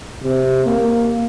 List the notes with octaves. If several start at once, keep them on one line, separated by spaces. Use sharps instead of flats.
C3
A#3